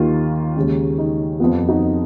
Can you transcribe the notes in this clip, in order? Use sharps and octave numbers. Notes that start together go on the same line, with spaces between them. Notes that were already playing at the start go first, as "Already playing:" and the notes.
Already playing: D#2 D#3 A#3 F4
D#2 C#3 G#3 C#4 D#4
D#4
F2 F3 B3 F4
D#4 F#4